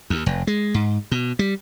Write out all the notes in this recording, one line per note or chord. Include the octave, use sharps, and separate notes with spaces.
D#2
F1
G#3
G#2
B2
G3